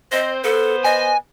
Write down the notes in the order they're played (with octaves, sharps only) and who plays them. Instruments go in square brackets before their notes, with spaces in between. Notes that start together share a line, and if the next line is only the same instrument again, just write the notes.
[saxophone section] C4 C5 [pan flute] D#5
[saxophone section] B3 C5 [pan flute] A4
[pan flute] D#5 [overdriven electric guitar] G#5